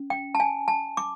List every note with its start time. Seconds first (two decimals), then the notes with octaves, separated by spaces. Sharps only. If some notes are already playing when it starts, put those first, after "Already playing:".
Already playing: C#4
0.10 G5
0.35 A5
0.40 G#5
0.68 A5
0.97 D6